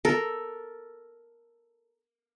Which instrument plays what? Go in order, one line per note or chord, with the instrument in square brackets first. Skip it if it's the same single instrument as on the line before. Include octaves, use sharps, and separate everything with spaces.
[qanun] A4 A#4